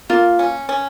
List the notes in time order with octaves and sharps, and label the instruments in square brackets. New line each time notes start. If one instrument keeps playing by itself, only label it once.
[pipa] A#3 [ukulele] F4
[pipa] C#4
C#4